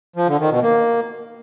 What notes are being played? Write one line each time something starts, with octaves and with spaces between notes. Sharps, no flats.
F3
D3
D#3
B2
A#3